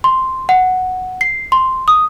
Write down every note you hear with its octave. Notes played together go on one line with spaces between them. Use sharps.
C6
F#5
C7
C6
D#6